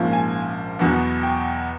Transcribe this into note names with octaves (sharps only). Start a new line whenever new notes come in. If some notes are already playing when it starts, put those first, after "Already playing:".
Already playing: A#1 G#2 F3 A#3 C#4
G#5
E2 B2 F#3 B3
G5